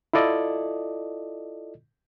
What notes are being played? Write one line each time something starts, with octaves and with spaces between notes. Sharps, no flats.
E4 F4 A4 D5 D#5